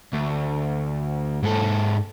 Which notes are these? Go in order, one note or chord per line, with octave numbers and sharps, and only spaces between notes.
D2
G#2 A4